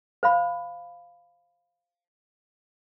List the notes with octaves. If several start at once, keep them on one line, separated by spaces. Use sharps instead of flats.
C5 F5 B5